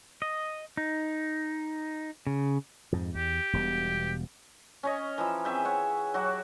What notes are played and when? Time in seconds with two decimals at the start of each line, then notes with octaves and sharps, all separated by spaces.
0.22 D#5
0.77 D#4
2.27 C#3
2.92 F2 G#2
3.15 E2 G4
3.53 E1 B2 G3
4.83 C#4 C#5 D#5
5.18 E3 F3 E5 A#5
5.45 C4 G#4 E5 G5
5.65 C#5 F#5
6.14 F#3 F#4 G4 F#5